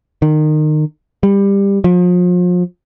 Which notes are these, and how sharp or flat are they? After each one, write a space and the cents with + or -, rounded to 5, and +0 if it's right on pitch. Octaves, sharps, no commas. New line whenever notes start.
D#3 -25
G3 +20
F3 +35